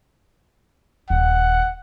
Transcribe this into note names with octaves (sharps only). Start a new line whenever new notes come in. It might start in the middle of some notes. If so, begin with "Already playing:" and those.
D#1 F#5